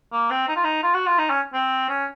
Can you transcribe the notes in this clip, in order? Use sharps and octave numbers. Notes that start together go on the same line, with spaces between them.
A#3
C4
D#4
F4
D#4
F4
F#4
F4
D#4
C#4
C4
C#4